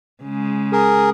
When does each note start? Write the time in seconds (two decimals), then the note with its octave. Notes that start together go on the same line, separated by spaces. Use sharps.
0.23 C#3 G#3
0.73 G#4 A#4